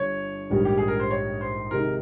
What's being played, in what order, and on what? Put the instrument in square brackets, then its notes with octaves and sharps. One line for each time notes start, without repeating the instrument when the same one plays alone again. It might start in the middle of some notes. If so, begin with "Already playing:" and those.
Already playing: [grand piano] G1 G2 [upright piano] C#5
[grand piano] A#1 G#2 D#3 G3
[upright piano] G4
G#4
A#4
C5
C#5
C5
[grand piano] C3 D#3 G#3 D#4 [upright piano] A#4